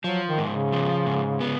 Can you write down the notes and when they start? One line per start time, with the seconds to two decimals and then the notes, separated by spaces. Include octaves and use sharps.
0.04 F3 F#3
0.27 D#3
0.38 G#2
0.50 C#3
0.72 F3
1.06 G#2
1.40 B3